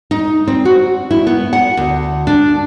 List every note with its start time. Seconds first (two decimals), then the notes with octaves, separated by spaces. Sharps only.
0.11 D#4
0.47 C4
0.65 F#4
1.11 E4
1.27 B3
1.53 F#5
1.77 D2
2.27 D4